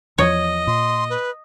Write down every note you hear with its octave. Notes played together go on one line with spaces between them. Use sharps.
E2 F3 C#5 D#5
A#2 C6
B4